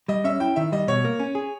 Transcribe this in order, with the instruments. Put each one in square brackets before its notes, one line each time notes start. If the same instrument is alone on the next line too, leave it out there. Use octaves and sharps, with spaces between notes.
[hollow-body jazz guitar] G3 [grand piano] D#5
[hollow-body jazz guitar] C#4 [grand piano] E5
[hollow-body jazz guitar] E4 [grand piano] G5
[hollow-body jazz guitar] D#3 [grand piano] E5
[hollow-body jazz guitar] G3 [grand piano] D#5
[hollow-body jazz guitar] B2 [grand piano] C#5
[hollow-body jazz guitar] A#3
C#4
G#4